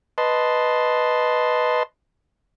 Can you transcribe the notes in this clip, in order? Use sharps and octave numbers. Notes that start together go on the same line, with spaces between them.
B4 D#5 A5 C6